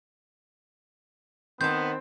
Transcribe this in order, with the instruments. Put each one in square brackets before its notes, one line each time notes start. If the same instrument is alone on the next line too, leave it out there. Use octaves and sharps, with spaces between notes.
[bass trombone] D#3 [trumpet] B3 [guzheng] C4 A5 [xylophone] G6